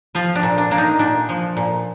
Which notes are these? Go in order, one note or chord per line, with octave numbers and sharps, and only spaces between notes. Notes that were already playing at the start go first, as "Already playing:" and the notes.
F3 F4
D4
A#2
D4
A#3 D4
D#4
A#2 D4
F3
A#2